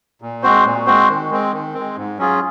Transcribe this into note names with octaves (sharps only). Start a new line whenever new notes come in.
A#2
G#3 C4 F#4 C5
A#2
G#3 C4 F#4 C5
D#3
G#3 C4
D#3
C4
G#3
G#2
F#3 C#4 F4 G#4